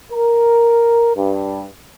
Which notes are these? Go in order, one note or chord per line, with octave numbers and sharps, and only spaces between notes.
A#4
G2